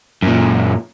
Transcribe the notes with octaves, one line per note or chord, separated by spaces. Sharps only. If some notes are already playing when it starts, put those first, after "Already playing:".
F#2 A#2